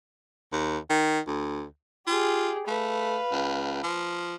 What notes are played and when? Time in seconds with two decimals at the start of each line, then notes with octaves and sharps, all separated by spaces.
0.52 D#2
0.90 D#3
1.27 D2
2.07 F4 G4 G#4
2.68 A3 B4 F5
3.32 C#2
3.83 F3